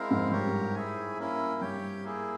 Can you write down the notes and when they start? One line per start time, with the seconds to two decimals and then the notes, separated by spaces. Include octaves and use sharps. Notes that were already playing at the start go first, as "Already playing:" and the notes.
Already playing: G#3 C4 E4 A#4 F5
0.11 F2 G#2
0.32 G2 G4 A#4 C#5
0.75 E4 G#4 E5 G#5
1.19 A#3 C#4 E4
1.61 G2 G4 C#5 G5
2.04 A#3 E4 G#4